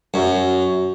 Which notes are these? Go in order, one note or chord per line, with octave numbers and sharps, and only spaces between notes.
F#2